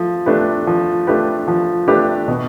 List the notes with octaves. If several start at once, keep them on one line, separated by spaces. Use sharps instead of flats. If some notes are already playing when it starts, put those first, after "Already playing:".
Already playing: F3 A3
A3 D4 G4 B4
F3
A3 D4 G4 B4
F3
A3 D4 G4 B4
B2